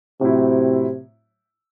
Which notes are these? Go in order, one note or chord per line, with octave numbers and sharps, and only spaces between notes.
A2 C3 F#3 C4 E4